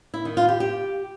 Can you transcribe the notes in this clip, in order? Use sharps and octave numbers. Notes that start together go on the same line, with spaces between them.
E4
D#3
F4
G4
G4